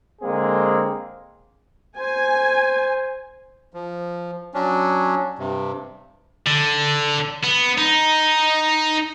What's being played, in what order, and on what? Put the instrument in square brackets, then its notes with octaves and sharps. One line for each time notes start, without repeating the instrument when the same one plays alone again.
[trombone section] D3 G#3 A#3 C4 G#4
[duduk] C5 [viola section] G#5
[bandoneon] F3
F#3 C#4 D4
G2 C3
[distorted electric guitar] D3
B3
D#4